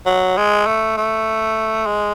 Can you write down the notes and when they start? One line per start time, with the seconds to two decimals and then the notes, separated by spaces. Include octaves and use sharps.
0.06 F#3
0.37 G#3
0.67 A3
0.97 A3
1.86 G#3